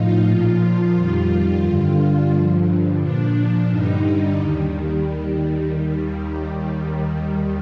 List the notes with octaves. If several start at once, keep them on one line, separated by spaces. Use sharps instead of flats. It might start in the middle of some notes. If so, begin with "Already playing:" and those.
Already playing: A2 F3 D#4 F4
A#2 F3
F4
F2 D#3 G3
G2 D3 G3 F4
G2 D3 F3
A#2 F3 D4
G2 D3 G3 D#4
D#2 D#3 G3